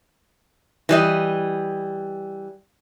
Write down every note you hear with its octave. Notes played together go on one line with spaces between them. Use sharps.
E3 G3 D#5